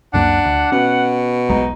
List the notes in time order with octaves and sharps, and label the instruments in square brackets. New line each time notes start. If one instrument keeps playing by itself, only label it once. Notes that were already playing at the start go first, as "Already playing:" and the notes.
[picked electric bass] C#2 F#2 A#3 [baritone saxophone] D4 [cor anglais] F#5
[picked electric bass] D2
[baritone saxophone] B2 [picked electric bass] C#4
[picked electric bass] E1 B1 G#3 [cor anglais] D#4